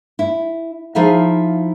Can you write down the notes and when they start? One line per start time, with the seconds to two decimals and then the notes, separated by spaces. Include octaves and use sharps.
0.19 E4
0.95 F3 D#4 E4 G#4 E5 F5